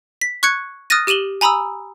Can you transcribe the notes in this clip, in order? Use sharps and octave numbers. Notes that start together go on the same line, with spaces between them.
B6
C#6 F#6 G#6 C#7
D#6 F6 F#6 A6 A#6 D#7
G4 D#7 E7 F#7 G7
G#5 A#5 B5 D#6 E6